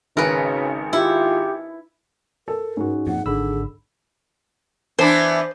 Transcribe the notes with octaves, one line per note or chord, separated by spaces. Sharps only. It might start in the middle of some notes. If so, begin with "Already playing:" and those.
G#1 C#3 A#4 B4
E4 F4 G4
A4 A#4
G#2 C#4 D#4 F#4
F2 A#2 F#5
G#1 D3 G#4 B5 E6
E3 B3 D4 C5